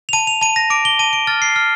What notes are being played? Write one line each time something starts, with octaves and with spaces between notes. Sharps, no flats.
F7
A5 D#7
F7
A5 D#7
A#6
D6 D7
G7
A5 D#7
D7
F6 A6
C7
F6